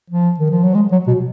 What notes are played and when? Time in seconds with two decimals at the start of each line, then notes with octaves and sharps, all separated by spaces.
0.10 F3
0.40 D#3
0.51 F3
0.64 F#3
0.75 G#3
0.92 F#3
1.07 B2